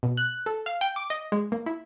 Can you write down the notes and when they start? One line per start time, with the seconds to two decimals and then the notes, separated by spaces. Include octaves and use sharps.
0.03 B2
0.17 F#6
0.46 A4
0.66 F5
0.81 G5
0.96 D6
1.10 D#5
1.32 G#3
1.52 A#3
1.66 E4